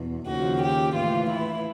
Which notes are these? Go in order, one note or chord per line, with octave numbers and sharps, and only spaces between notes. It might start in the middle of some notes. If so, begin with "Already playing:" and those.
Already playing: E2 B2
D#2 C#3 F3 F#4
G4
A2 E3 F4
E4